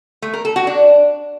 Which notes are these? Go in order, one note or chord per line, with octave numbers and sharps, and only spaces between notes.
A3
A#4
A4
F#4
D4